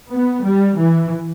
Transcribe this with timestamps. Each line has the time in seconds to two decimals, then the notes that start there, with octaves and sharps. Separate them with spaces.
0.11 B3
0.44 G3
0.77 E3